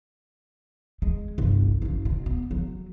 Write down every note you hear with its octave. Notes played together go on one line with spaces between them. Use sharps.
G#3
G1 C2
F#1 C#3
B2
B3
F#3